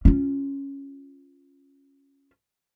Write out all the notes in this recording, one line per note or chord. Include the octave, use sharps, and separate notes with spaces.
C#4 F4